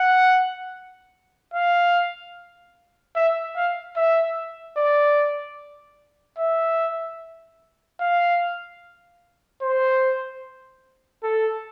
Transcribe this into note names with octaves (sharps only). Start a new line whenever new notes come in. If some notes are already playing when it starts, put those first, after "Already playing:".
Already playing: F#5
F5
E5
F5
E5
D5
E5
F5
C5
A4